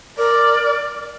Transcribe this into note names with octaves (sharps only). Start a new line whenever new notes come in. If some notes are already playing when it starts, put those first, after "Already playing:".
A#4 D5